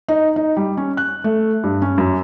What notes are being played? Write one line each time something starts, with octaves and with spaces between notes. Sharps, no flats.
D#4
D#4
G3
C#4
F#6
A3
G2
C#4
F#2